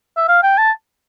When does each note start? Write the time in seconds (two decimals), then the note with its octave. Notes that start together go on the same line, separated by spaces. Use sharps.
0.17 E5
0.28 F5
0.43 G5
0.58 A5